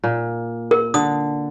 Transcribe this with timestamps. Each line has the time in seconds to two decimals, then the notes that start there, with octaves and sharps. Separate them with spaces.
0.04 A#2
0.71 A#4
0.94 D3 D#6